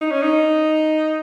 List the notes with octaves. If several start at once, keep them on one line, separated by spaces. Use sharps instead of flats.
D#4
C#4
D#4